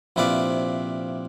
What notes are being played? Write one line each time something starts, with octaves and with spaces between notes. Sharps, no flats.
A#1 C3 E4 B4 D5 F5